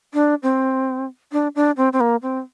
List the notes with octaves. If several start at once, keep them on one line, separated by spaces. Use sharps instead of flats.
D4
C4
D4
D4
C4
C4
A#3
C4